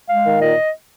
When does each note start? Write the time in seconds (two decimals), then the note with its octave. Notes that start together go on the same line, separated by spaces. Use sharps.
0.08 G#3 F5
0.24 D#3
0.40 A#2 D#5